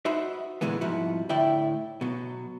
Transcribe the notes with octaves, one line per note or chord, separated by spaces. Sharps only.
D#4 F#4 C5 E5 B5
A#2 D3 E3 G#3 B3
C2 G#2 F3 E4 F#4
D2 A2 E4 D5 E5 G5
B2 F#3